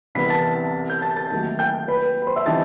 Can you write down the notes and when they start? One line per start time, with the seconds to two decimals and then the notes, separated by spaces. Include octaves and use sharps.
0.15 C2 C3 E3 B3 B5 B6
0.30 A5 A6
0.90 G6
1.01 A5 A6
1.16 A5 A6
1.31 D#2 D#3 F#3 A3 E4
1.59 G5 G6
1.88 B4 B5
2.22 B5
2.27 C5 C6
2.36 E5 E6
2.46 E3 G3 C4 D#4 A5 A6